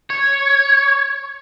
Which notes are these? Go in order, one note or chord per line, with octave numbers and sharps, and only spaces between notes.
C#5